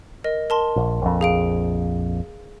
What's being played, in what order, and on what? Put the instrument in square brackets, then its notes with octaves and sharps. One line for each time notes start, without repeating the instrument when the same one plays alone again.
[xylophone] A#4 D#5
A#4 A5 C6
[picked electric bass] A#1
A#1 F2
[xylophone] G#4 F5 D7